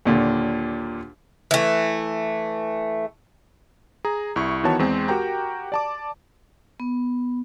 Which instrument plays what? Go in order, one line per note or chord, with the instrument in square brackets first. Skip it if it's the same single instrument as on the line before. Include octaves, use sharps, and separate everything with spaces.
[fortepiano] D#2 A#2 D3
[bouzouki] E3 A3
[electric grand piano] G#4 A#5
C2 E4 C#6
D#3 E3 B3 F#4 C#5 A5
E2 G#3 C4
F#4 G4 A#4 G5 A#5
D5 A5 D6
[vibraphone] B3